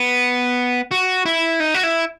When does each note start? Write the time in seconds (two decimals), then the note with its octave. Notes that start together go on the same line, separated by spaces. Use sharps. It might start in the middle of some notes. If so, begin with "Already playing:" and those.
Already playing: B3
0.91 F#4
1.26 E4
1.60 D#4
1.74 F#4
1.83 E4